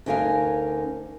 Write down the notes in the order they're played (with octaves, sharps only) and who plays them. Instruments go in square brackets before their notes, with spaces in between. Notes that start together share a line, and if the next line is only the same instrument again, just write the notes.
[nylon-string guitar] D2 C#4 D#4 A#4 F5 G#5